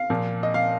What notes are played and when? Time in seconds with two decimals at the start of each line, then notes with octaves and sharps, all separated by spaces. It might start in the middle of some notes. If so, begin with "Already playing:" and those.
Already playing: F5
0.10 A#2 F3
0.43 D#5
0.54 F5